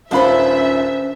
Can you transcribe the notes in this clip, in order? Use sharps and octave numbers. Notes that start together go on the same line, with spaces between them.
D#1 C#4 D4 F4 B4 C5 E5 B5